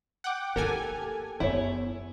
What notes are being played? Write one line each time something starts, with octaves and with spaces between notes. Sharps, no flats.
F#5 G5 D6
A#3 E4 G4 A4 A#4 G#5
F#1 B3 E4 C#5